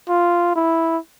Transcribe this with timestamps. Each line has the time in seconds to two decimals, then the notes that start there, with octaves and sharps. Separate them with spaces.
0.09 F4
0.56 E4